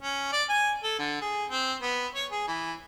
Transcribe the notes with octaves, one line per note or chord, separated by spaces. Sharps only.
C#4
D5
G#5
A4
D3
G#4
C4
B3
C#5
G#4
E3